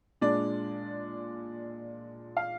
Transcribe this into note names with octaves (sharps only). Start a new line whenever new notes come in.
A#2 G#3 D4 D5
F5